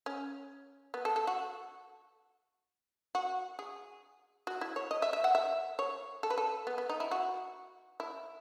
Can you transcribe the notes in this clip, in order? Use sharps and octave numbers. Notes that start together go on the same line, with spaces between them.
C#4
B3
A4
A4
F#4
F#4
G#4
F#4
E4
C#5
D#5
E5
E5
F#5
E5
C#5
A4
B4
A4
B3
B3
D#4
E4
F#4
E4